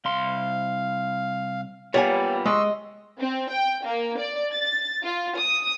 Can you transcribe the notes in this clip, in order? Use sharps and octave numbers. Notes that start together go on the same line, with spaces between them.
C2 F5 C6
G3 A#3 B3 F4 C#5 F#5 G#5
G#3 D#5 C6 C#6 E6
C4
G5
A#3
D5
A6
F4
D#6